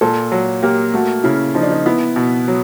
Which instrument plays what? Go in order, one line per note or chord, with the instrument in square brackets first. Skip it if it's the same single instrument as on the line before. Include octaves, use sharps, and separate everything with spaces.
[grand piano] A#2 [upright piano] A4
[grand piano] F#3
[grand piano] A#3 [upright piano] G4
[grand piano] A3 [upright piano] F#4
[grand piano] C#3 [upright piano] E4
[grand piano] F3 [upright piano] D#4
[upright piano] D4
D#4
[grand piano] B3 [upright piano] E4
[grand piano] B2
F#3